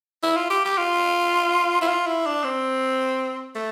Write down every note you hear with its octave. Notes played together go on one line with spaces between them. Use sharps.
E4
F4
G4
G4
F4
E4
F4
E4
D4
C4
A3